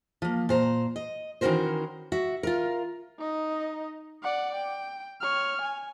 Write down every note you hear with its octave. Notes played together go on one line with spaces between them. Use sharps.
F3 A#3
A#2 C5 A#5
D#5
D#3 E3 C#4 F#4 A#4 C5
F#4 E5
F4 A#4
D#4 D#5
D5 F#5
G5
C#5 F6
G#5